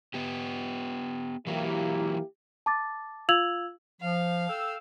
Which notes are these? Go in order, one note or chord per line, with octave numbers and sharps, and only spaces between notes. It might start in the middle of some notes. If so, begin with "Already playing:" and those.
B3 G4
E3 F#3 A#3 E4 G4
A5 D6 A6
F4 F5 E6 G#6 F7 F#7
F3 F5
A4 G5 E6